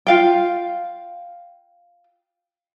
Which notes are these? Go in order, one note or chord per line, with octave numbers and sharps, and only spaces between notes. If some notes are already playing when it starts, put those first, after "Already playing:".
F4 F5 G5